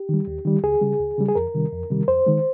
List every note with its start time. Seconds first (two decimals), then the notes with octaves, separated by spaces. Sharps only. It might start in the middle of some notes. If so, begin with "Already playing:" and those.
Already playing: G4
0.09 D#3 G3
0.27 D#2
0.45 D#3 G3
0.64 C#2 G#4
0.81 C#3 G3
1.00 C#2
1.18 C#3 G3
1.29 G#4
1.35 F2 A#4
1.54 C3 D#3 G3
1.72 F2
1.90 C3 D#3 G3
2.08 F2 C5
2.26 D#3 G#3